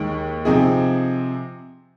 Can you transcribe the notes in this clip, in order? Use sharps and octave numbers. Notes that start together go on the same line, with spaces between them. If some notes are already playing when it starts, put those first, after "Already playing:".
Already playing: D#2 D#3 G#3
C3 F3 C4 D#4 G#4